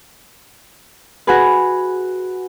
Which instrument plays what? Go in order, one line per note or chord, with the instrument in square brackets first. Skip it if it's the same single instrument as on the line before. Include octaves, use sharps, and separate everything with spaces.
[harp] F#4 G#4 B4